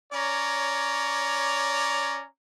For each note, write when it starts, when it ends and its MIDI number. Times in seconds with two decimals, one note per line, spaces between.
0.13 2.25 61
0.13 2.25 73
0.13 2.25 74
0.13 2.25 82